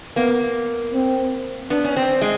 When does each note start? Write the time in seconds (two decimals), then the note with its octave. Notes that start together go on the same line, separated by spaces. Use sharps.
0.16 A#3 B3
0.93 C4
1.70 B3 D4
1.85 C#4
1.97 C4
2.21 G#3